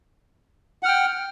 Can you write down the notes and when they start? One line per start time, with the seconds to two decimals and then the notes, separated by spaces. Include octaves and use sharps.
0.83 F#5
0.85 F6
0.88 G5